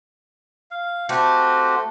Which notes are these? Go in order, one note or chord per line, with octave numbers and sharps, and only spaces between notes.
F5
A3 C4 F#4 G4